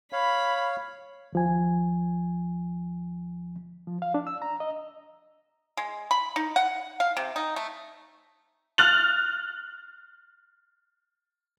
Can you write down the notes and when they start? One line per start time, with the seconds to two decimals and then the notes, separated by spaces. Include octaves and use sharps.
0.13 C#5 F5 B5
1.33 D#2 F3 G#5
3.87 F3
4.02 F5
4.14 D4
4.27 E6
4.42 A#5
4.60 D#5
5.77 G#3
6.11 B5
6.36 D#4
6.56 F#5
7.00 F5
7.17 C3
7.36 D#4
7.56 A3
8.78 F6 F#6 A6 F7 F#7